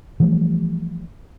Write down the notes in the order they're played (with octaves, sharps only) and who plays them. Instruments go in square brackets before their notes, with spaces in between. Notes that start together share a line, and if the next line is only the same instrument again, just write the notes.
[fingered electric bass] E3 F3 G3 A3